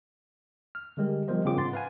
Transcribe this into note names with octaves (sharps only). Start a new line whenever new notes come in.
F6
D3 G3 G#3 G4 A#4
F3 G3 B3 A#4 C5 D#5
C#3 C4 F4 G#4 D6
G#2 F#5 C6 A6
B4 F5 G#5